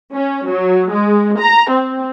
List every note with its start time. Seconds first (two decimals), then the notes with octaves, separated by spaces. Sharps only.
0.12 C#4
0.49 F#3
0.90 G#3
1.39 A#5
1.69 C4